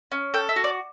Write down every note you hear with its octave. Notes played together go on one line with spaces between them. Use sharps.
C#4
A4 G5
E5
F#4
D5